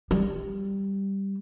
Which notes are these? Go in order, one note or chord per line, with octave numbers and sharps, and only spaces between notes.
G3